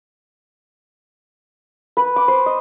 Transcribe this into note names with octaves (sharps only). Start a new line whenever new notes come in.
B4
D6
C5
D#5